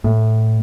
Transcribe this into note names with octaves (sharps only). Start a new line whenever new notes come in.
A2